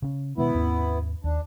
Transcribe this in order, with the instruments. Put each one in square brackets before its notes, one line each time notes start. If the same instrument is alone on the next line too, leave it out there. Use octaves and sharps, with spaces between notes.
[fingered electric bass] C#3 C#4
[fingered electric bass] B2 D#3 G#3 [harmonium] B3 E4
[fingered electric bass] D#2 G#2 C#4
[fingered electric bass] D#2 [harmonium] D4